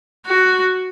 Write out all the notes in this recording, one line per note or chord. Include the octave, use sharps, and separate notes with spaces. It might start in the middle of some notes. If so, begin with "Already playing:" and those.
F#4